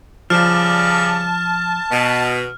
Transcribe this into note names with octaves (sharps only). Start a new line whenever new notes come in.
C#3 F3 G3 D5 A5 F6
B2